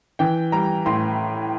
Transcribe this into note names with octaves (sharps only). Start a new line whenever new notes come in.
E3 G5
G3 A#5
A2 C6